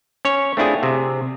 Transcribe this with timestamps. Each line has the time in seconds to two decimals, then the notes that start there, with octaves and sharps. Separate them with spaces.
0.25 C#4 C#5
0.57 A3 C4 D4 E4 F4 G#4
0.83 C3 G#4